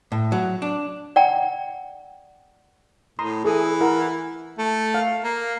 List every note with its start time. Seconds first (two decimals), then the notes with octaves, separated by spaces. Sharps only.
0.12 A2
0.32 F#3
0.62 D4
1.16 D5 F#5 G5 A#5
3.19 A2 A#5 C6 D#6
3.44 E3 G#4 A4 D#6
3.81 E4 A#4 F#5
4.58 A3
4.94 F5
5.24 A#3